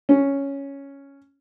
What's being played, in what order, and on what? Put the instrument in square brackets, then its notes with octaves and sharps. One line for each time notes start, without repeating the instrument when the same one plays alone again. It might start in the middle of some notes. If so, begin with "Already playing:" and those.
[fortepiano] C#4